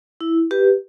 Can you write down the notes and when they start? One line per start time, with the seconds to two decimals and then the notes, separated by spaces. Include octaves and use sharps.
0.21 E4
0.51 G4 B4